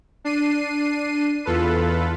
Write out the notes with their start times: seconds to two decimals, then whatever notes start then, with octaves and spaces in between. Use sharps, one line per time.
0.25 D4 C7 D#7
1.45 E2 F4 A4 B4